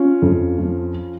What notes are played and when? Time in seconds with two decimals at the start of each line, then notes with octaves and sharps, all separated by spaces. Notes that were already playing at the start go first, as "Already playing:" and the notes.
Already playing: C#4 F4
0.22 F2
0.58 F3